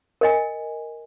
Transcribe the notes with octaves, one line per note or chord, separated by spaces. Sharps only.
A#4 D#5 G#5